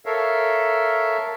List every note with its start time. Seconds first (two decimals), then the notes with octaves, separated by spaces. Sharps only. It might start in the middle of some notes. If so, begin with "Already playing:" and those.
0.06 A4 A#4 C#5 E5 F5